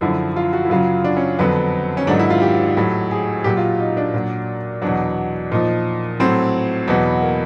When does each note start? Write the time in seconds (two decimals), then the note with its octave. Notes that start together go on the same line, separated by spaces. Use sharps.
0.01 F#2 D3 F3 E4
0.36 F4
0.53 F#4
0.65 E4
0.70 F#2 C#3 F#3 F4
1.04 D4
1.17 C#4
1.39 F2 D3 F#3 B3
1.97 C#4
2.07 G#2 D#3 F#3 D4
2.19 E4
2.30 F4
2.42 G4
2.77 A2 F#3
3.11 G#4
3.44 A#2 F#3 G4
3.57 F4
3.80 D#4
3.97 D4
4.14 A#2 F#3
4.82 E2 B2 F#3 D4
5.52 A#2 F3 D#4
6.20 A2 F#3 C4
6.88 E2 B2 F#3 B3
7.23 A#3